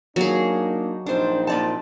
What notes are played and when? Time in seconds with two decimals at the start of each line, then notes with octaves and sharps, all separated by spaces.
0.16 F#3 A#3 D4 D#4 G#4
1.06 A#1 C4 D4 D#4 C5
1.47 A#2 D5 A5